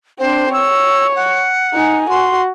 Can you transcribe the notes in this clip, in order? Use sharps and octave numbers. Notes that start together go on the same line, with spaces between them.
C4 D4 C5
C#5 E6
F#5
D#4 G#5
F#4 C6